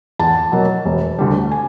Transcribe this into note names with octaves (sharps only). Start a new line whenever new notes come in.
E2 A5
B2 F#3 A#3
E1
D2 D3 G3
G#5